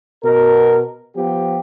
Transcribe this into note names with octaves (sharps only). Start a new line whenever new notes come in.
B2 A#4
F3 B3 G4